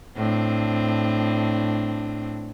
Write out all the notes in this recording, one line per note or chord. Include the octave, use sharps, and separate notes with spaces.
A2 C4 D4